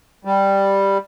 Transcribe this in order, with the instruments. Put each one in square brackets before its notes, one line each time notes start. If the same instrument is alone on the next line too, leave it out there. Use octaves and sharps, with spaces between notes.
[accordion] G3